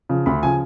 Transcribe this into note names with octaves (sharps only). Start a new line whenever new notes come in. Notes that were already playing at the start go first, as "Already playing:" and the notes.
C#3 F3
D2 B5
C#3 F3 G#5